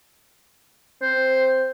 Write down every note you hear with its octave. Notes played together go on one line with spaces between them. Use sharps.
C4 C5